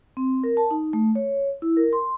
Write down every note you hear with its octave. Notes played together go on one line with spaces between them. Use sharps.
C4
A#4
A5
D#4
A3
C#5
E4
A#4
C6